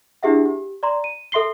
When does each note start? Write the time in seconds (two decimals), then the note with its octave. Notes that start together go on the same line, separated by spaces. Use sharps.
0.23 D4 E4 G4 G#4 E5 F#5
0.46 G4
0.83 D5 A#5 C6
1.04 D#7
1.32 A4 E5 C6 C7 G7